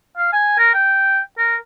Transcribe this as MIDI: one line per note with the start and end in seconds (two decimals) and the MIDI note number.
0.17 0.31 77
0.33 0.56 80
0.58 0.72 70
0.74 1.19 79
1.38 1.56 70